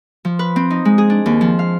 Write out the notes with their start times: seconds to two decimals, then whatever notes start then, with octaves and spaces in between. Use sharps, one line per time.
0.25 F3
0.39 B4
0.56 C4
0.71 D#4
0.85 G#3
0.98 G#4
1.10 D4
1.26 D#2
1.41 F3
1.59 F5